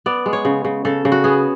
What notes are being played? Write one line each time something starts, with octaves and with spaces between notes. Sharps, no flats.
B3 D5
G#3
C#5
C#3
C#3
C#3 A4
C#3
F#4
B3 G#4